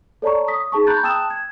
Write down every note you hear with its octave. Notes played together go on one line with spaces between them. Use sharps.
A4 C#5 D5 A5 A#5 C#6
D#6 B6
D#4 G#4 A5 C#6
A#5 B5 F#6 G6 A6
G5 A5 D#6 E6 F#6 E7
G#6